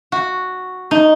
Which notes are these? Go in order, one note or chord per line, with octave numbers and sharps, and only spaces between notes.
F#4
D#4